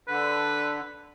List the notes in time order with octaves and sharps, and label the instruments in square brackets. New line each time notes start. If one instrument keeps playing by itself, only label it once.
[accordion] D3 [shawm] B4